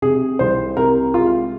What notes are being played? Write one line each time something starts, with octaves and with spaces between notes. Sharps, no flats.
C3 G#4
C2 C5
C3 A#4
G#3 F4